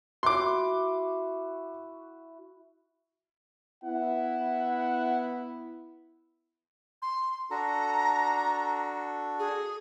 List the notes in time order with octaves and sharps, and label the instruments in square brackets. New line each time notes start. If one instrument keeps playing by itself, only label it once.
[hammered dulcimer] E4 F#4 [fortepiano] C6 D6
[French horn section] B3 E4 [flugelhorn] F#5
[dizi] C6
[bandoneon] D4 F#4 A4 [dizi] A#5
[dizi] G#4